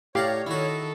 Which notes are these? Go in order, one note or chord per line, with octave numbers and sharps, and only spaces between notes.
A2 G4 C#5 D5 F5 F#5 A#5
D#3 E4 F#4 A4